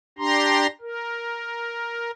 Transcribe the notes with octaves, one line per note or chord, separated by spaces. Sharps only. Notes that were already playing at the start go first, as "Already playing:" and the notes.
D4 G4 A#5 C6
A#4